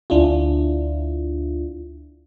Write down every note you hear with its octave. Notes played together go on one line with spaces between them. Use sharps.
D2 D4 E4 F4